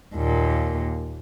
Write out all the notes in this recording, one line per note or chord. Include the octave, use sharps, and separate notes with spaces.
D#2 A#2